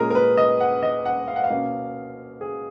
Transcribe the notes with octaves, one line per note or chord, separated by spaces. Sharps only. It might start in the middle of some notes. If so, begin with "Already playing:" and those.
Already playing: A#2 G#3 C#4 G#4 A#4
A#4
B4
D#5
F#5
D#5
F#5
F5
F#5
F5
B2 A#3 C#4
G#4